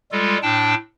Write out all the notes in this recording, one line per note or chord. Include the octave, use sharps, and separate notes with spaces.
G3 G#3 F4 A4
A2 D4 G5 A5